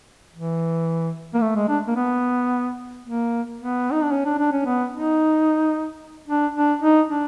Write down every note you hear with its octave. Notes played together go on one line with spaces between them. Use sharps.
E3
A#3
A3
G#3
D4
A#3
B3
A#3
B3
D#4
D4
C#4
D4
D4
C#4
B3
D#4
D4
D4
D#4
D4